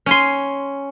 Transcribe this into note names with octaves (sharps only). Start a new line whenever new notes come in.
C#4 G#5 C6